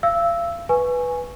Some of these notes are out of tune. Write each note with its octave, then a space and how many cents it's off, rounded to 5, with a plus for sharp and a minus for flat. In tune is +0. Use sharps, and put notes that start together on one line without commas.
F5 -40 E6 -5
B4 +0 G#5 +0 C#6 +0